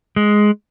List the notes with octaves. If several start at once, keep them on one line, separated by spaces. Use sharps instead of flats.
G#3